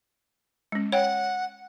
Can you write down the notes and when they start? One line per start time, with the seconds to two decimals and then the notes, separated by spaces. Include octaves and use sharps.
0.72 G#3 C#4
0.92 C#5 F#5 G5